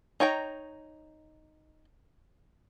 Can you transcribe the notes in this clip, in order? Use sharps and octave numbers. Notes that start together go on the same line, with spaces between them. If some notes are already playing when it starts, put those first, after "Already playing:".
D#4 C#5 G5 A#5